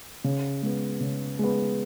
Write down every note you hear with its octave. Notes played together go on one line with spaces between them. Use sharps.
C#3
G#3 B3
C#3
G#3 B3